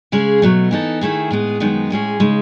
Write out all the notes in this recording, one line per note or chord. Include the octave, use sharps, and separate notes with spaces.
C#3 G#3 C#4 G#4
B2 F#3 A3
E3 B3 D#4 A4
D#3 A3 E4 G#4
A2 G#3 B3 E4 G#4
F#2 D#3 G#3 B3 D#4
A2 G#3 C#4 G#4
C#3 G#3 D#4